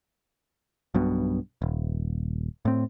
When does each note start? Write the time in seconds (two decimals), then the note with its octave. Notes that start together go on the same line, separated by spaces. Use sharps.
0.94 B1 G2 B2
1.62 D#1
2.65 A2 C4